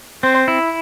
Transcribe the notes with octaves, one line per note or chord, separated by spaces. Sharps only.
C4 C5
E4